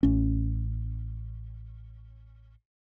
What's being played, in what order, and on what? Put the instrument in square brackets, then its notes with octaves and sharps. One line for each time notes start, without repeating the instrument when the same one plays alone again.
[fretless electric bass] A1 C#4